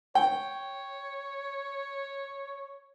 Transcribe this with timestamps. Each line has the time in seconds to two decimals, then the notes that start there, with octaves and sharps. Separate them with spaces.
0.15 C#5 G5